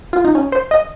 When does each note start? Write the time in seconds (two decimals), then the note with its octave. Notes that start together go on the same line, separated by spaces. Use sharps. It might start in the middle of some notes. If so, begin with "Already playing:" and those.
0.13 F4
0.25 D#4
0.35 C#4
0.52 C5
0.71 D#5